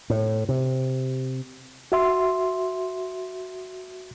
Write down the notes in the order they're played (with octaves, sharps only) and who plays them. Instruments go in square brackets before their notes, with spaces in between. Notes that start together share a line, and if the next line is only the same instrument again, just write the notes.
[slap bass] A2
C3
[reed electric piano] F#4 E5 C6